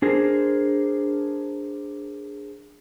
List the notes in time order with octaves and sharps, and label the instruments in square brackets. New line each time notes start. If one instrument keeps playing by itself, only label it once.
[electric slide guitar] D4 G#4 A#4 C5